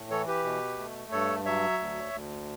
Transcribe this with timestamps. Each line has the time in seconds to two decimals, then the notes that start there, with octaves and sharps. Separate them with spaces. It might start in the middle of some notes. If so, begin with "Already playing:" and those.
Already playing: A2
0.10 E3 A4 C#5
0.27 G4 B4
0.44 B2
0.78 A3
1.12 G2 A4 C#5
1.45 F#3 C#5 E5
1.79 D2
2.13 D2